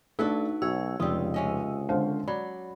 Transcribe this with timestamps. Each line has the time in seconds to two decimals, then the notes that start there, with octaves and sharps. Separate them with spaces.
0.19 A3 D4 D#4 F#4 A4 B4
0.62 B1 F#4 C#5 E6
1.00 F1 C#2 G3 F4 D#6
1.34 C3 C#4 D#5
1.89 D3 G#3 C5 F5
2.28 F#3 D5 B5